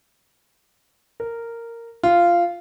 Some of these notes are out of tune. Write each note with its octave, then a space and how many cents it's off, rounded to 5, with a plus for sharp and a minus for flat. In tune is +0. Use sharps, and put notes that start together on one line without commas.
A#4 -10
F4 -10